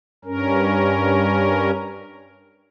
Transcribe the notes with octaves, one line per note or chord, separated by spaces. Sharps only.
G2 C#4 A#4